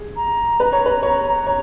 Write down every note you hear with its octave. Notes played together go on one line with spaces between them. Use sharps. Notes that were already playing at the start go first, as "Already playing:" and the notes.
Already playing: G#4
A#5
B4
C#5
B4
C#5
C#5